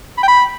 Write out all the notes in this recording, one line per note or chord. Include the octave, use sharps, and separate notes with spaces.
B5
G5
B5